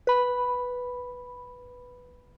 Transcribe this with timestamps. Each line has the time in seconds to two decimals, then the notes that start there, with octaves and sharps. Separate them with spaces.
0.07 B4 B5